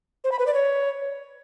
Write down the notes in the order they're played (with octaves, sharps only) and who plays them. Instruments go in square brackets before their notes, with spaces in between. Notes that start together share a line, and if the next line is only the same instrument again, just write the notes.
[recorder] C5
B5
B4
D5
C#5